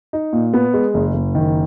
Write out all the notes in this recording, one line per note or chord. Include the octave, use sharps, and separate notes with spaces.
D#4
A#2
B3
G#3
F#1
F#1
D#3